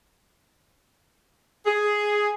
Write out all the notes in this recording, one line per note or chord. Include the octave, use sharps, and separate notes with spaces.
G#4